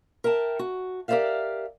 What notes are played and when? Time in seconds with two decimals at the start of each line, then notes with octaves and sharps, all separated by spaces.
0.24 A#4 E5 G5 A5
0.59 F#4
1.08 G4 A#4 C5 D5 E5 F5